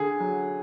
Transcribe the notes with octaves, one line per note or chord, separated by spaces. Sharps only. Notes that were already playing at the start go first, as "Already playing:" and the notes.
Already playing: D3 G#4
F#3